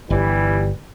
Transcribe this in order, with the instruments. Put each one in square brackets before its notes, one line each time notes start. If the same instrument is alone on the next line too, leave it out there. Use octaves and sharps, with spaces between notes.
[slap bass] G1 [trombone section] E3 G3